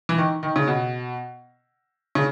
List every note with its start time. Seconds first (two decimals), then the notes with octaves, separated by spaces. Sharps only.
0.09 E3
0.18 D#3
0.43 D#3
0.56 C#3
0.67 B2
2.15 C#3